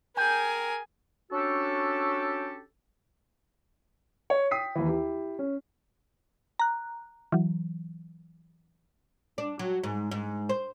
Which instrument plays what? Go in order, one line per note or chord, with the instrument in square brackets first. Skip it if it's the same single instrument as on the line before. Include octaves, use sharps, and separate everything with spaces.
[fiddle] G#4 G#5 [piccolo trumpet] A#4 [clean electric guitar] G5
[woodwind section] C#4 D4 F#4 G4 A4
[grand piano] C#5
G5 D#6 B6 C7
D#2 E3
E4 G4
C#4
[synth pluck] A#5 F#6
E3 F#3
[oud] D4
F#3
G#2
G#2
C5